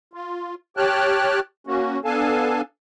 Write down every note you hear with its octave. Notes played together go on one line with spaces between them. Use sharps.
F4
G4 C#5 G5 A5 F6 F#6
A#3 C#4 F#4
B3 D4 A4 F5 G#5 A5